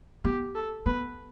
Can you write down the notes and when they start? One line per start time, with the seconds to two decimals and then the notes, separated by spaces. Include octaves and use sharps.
0.24 B3 G4
0.55 A4
0.86 B3 B4